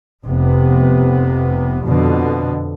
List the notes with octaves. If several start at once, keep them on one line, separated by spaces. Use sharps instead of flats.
F1 C3 B3
F2 B2 D3